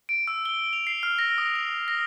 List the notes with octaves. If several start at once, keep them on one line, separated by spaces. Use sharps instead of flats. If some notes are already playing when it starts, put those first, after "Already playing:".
D7
E6
G7
F7
C7
F6
A#6
D#6
F7
A#6